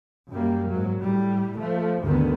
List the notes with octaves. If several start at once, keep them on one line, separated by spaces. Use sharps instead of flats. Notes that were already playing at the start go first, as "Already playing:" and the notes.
F#2 G3 A#3
G#2 F#3
A2 G3
F3 A3
D2 G2 D3 D#3 B3